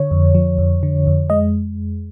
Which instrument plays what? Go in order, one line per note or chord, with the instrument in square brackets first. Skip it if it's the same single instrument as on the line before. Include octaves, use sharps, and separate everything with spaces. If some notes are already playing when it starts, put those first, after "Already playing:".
Already playing: [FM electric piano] D3 C#5
F2
F3
F2
D3
F2
G#3 D#5